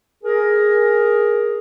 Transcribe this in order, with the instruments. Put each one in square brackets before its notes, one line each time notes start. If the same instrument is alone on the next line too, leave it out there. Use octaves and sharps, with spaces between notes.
[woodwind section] G#4 A#4